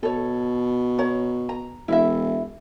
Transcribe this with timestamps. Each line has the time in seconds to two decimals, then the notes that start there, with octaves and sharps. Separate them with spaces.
0.03 B2 A4 C#5
0.99 C#5 A#5
1.49 A#5
1.88 E1 E4 E5